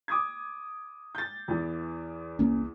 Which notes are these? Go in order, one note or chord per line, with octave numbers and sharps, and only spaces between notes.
D6 D#6 G#6
G6 A6
E2 E3
C2 A#3 C#4